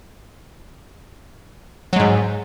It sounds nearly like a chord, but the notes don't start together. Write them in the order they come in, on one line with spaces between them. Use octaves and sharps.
F#3 G#3 G#2